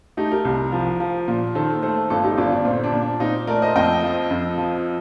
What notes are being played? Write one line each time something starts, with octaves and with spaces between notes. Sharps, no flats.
A3 D#4 G4
G4 A#4
C2
F3
F3
A#2
D#3 A4 C5
A3 A4 C5
G1 F4 A4
D#4 G4
G1 D4 F4
D4
A#2 C4
D4
A#2
D4
A#2 C4 D#4
A3 A#4 D5
C5 D#5
F2 D#5 G5
F3
F2
F3